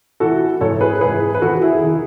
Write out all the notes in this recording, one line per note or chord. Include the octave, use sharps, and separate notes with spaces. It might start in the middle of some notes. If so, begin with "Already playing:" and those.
A2 E3 F#4 A4
G#2 E3 A4 C#5
G#4 B4
G#2 E3 G#4 B4
B4
E2 D#3 F#4 A4
E4 G#4
D#3